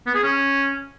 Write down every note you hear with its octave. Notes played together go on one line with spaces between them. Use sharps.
B3
G#4
C#4